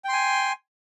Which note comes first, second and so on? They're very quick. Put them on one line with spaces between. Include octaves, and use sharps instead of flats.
G5 C6 G#5